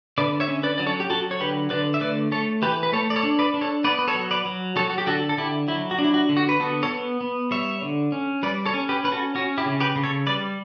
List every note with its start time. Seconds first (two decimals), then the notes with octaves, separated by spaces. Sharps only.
0.18 D3 B4 D5
0.40 C#5 E5
0.48 C#4
0.63 B4 D5
0.78 F#3 D5
0.86 A4 C#5
1.00 G4
1.10 F#3 F#4 A4
1.31 C#5
1.40 D3 G4 B4
1.70 D3 B4 D5
1.94 E5
2.01 A3 B4 D5
2.32 A3 A4 C#5
2.62 E3 G4 B4
2.83 B4
2.92 A3 A4 C#5
3.10 D5
3.16 A4 C#5
3.23 D4
3.39 B4 D5
3.54 D4
3.61 A4 C#5
3.84 B3 B4 D5
3.99 B4
4.08 A4 C#5
4.15 F#3
4.31 B4 D5
4.45 F#3
4.76 F#3 A4 C#5
4.90 F#4
4.98 G4
5.07 D3 F#4 A4
5.29 A4
5.37 D3 E4 G4
5.68 F#3 E4
5.91 F#4
5.98 D4
6.04 E4
6.14 F#4
6.29 D3
6.37 F#4
6.49 B4
6.60 B3 F#4 A4
6.83 A4 C#5
6.90 B3
7.21 B3
7.51 G3 C#5 E5
7.82 D3
8.12 C#4
8.43 G3 B4 D5
8.66 A4 C#5
8.74 C#4
8.89 G4 B4
9.04 C#4 B4
9.12 F#4 A4
9.35 C#4 F#4
9.58 E4 G4
9.65 C#3
9.80 G4 B4
9.96 C#3
10.04 A4 C#5
10.26 G3 B4 D5